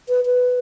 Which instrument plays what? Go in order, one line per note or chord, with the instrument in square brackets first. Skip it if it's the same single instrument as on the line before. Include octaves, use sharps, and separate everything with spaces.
[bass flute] B4
B4